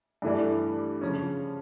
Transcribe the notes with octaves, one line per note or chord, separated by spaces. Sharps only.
G2 E3 A3 D4
C#3 F3 C#4